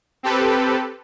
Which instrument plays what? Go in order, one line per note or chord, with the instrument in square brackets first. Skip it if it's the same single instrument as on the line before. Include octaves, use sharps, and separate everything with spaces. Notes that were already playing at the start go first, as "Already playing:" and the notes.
[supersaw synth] C4 G4 A4 B4